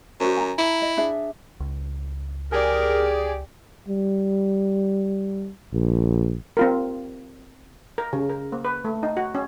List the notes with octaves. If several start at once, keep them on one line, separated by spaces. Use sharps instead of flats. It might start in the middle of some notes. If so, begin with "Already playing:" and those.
F#2 F#4 C5
G#5 A#5
E4
D#5
D4 G#4 E5
C#2
G4 G#4 A#4 D5
G3
A#1
C4 F4 A#4
A#4
C#3
A#4
A#3
B4
A3
D#4
F#4
C#4